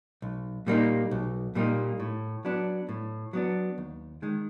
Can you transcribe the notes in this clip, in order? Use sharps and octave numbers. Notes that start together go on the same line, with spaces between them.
B1
A#2 G3 A#3 D#4
B1
A#2 G3 A#3 D#4
A2
F#3 B3 D4
A2
F#3 B3 D4
D#2
D#3 G#3